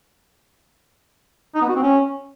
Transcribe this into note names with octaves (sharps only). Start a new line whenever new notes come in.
D#4
B3
F#4
C4
C#4